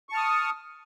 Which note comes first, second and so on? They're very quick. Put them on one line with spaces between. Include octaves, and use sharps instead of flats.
C#6 A5 F6 D#6